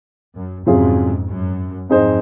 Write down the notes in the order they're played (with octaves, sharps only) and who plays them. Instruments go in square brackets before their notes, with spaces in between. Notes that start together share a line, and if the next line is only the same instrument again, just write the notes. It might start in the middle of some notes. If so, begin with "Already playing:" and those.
[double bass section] F#2
[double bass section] F2 G#2 [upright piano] C3 F#3 C#4 F4 G#4
[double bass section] F#2
[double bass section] F2 G#2 [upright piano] C4 D#4 G#4 C5 D#5